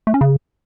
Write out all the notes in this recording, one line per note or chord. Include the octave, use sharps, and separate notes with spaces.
A3
C#4
C#3